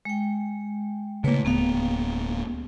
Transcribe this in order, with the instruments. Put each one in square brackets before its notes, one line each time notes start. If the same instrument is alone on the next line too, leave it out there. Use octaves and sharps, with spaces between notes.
[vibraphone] G#3 G5
[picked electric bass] C#3 A#3 [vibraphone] A3 B4 C#5
[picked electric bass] D1 B3 [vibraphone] A#3 F5